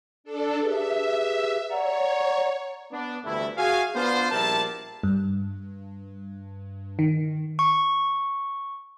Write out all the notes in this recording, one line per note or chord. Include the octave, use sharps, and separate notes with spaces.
D4 A4
G4 G#4 B4 E5
C#5 D5 F#5 A#5
B3 D4
D2 G2 E3 A3 E4
F#4 G#4 F5 G#5
B3 D4 F4 C5
A#1 G3 E4 A#4 D5 A5
G2
D#3
C#6